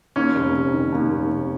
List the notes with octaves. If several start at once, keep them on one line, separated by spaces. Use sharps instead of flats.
D#2 C#4
F1
F1
D#3
D#2
F1
F1